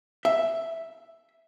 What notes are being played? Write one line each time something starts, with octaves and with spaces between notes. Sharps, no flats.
E5